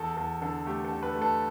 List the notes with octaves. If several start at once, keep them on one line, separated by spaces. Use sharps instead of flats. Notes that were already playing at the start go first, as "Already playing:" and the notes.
Already playing: E2 A4
E2 A4
D3 A4
A3 G4
A4
D3
B4
A3
A4